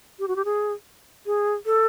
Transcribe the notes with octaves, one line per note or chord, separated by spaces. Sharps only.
G4
F#4
G4
G#4
G#4
A4